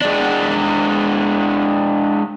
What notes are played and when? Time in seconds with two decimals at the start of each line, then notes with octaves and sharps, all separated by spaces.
0.02 G#3 D4